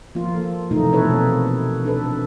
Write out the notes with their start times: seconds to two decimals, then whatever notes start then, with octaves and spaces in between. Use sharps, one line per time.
0.15 F3 A#3 F4
0.34 A4
0.71 C3 E3 F3 A3 D#4
0.93 B2 A#3 C4 A4 B4 C#5
1.84 D4 A4 B4